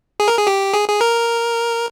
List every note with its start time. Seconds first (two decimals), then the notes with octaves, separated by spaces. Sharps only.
0.20 G#4
0.28 A#4
0.37 G#4
0.47 G4
0.74 G#4
0.89 G#4
1.01 A#4